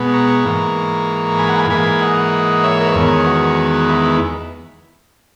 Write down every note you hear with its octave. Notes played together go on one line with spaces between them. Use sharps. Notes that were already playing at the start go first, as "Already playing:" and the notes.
Already playing: B2 G#3 B3
A#5 C#6
G#2 E3 A#3
G#5 B5
F#5 A#5
G#5 B5
G#2 E3 A#3 G#5 B5
D#5 F#5
C#5 E5
A#4
B4
E2 D#3 G#3 B3 A#4 C#5
F#4
E4